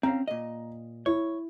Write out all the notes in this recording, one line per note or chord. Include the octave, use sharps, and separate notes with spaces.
C4 C#4 F5 A#5
A#2 D#5
E4 C#5